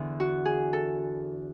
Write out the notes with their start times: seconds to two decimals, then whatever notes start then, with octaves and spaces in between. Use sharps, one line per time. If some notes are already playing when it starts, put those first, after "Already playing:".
Already playing: E2 D3 E4
0.20 F#4
0.45 G#4
0.73 A4